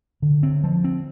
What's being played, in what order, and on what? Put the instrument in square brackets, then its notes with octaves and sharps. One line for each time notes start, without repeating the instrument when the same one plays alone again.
[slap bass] D3
C4
F3
C4